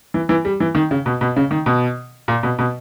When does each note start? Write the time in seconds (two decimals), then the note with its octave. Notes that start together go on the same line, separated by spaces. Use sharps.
0.14 E3
0.29 E3
0.45 G3
0.60 E3
0.75 D#3
0.91 C#3
1.06 B2
1.21 B2
1.36 C#3
1.51 D#3
1.66 B2
2.28 A#2
2.43 B2
2.59 B2